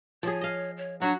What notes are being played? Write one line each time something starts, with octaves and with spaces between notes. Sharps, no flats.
F3 G#4 C#5
D#5 F5
C#5
F#3 D4 F#4